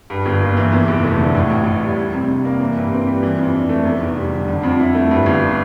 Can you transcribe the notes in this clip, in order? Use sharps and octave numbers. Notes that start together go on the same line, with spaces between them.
G2
G1
A#3
E3
E2
F1
A3
D3
A2
A1
A1
G3
G3
C3
D4
A#3
E3
G2
C4
G3
E3
F2
D4
A3
E2
F1
G3
D3
D3
F2
E4
A3
G2
G1